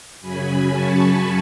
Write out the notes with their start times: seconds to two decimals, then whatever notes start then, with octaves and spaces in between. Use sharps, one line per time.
0.21 F#2 C#3 F#3 G#5 B5
0.68 A5 C#6